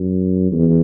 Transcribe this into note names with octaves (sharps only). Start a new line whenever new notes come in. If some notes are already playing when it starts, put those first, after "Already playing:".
Already playing: F#2
E2